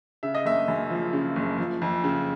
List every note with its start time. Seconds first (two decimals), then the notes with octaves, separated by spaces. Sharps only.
0.23 C#3 E5
0.35 D#5
0.45 F#1 E5
0.68 F#2
0.90 F3
1.13 C#3
1.36 F#1
1.58 F3
1.82 F2
2.04 C#3